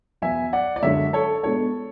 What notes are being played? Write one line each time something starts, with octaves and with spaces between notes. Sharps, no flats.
E2 B2 F#3 B3 E5 G#5
D5 F#5
D5
F#2 D3 G#3 D4 C#5 E5
A4 C#5
B2 G#3 B3 D4 A4 C#5